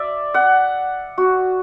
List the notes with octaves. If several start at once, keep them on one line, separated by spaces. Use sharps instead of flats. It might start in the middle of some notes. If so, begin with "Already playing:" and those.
Already playing: D5 E5
F#5
F#4